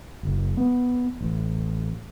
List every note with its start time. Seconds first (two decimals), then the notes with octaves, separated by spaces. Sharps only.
0.23 F#1
0.57 B3
1.21 A1